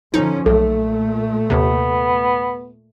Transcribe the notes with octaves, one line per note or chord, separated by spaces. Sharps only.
D3 F3 C#4 D#4
B1 A#2 A3 A4
D#2 C3 B3